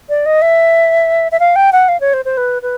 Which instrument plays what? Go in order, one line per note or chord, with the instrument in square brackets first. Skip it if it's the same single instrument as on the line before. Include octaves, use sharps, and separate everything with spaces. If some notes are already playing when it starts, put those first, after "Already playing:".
[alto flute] D5
D#5
E5
E5
F5
G5
F#5
F5
C#5
C5
C5
B4
B4